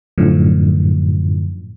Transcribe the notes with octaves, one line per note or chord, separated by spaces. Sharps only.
F#2 A2 D3 F3